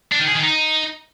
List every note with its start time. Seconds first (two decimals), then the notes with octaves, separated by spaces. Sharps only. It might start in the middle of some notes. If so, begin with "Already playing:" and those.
0.12 D4
0.20 D#3
0.28 G#4
0.35 D#3
0.43 D#4